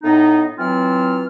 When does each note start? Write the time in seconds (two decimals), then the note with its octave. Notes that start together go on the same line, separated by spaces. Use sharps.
0.03 A2 B3 D#4
0.58 E3 F#3 C4 F4 F6